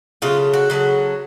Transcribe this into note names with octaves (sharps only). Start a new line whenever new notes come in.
C#3 F#3 A3 F4
F#4
C#3 F#3 A3